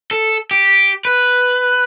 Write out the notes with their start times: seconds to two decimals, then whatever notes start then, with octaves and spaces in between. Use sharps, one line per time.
0.11 A4
0.51 G4
1.05 B4